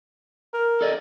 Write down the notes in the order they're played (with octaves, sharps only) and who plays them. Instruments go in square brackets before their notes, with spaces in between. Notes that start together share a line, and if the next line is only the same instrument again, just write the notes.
[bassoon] A#4
[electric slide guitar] A4 D5 D#5